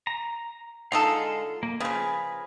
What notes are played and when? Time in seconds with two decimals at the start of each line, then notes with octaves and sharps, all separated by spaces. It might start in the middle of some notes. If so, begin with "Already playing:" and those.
0.07 A#5
0.92 D3 G#3 D#4 F4 A4 F5
1.63 A#3
1.80 C#3 F3 G#4 A#4 B4